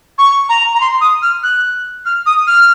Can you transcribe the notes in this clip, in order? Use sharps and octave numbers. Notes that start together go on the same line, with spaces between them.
C#6
A#5
A#5
C6
D#6
F6
F#6
F6
D#6
F6